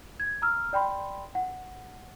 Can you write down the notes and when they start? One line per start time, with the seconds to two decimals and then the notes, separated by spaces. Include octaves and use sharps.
0.20 G#6
0.42 A#5 E6 F6
0.73 D5 G5 B5 C6
1.35 F#5